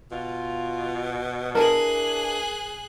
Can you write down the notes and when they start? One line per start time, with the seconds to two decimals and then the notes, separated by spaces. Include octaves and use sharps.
0.12 B2 F4
1.55 E3 D4 G#4 A#4 A5 F#6